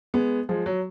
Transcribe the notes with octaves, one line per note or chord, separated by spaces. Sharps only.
G#3 B3
F3 G#3
F#3